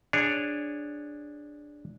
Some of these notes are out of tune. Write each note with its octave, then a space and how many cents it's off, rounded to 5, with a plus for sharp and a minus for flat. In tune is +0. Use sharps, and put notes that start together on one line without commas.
D4 +0 G#4 -15 C#5 +0